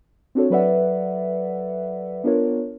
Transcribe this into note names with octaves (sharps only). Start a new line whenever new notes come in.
C4 D4 F#4 A4 C#5
F#3 A4 B4 D5 E5 F#5
B3 D4 F4 A#4 C#5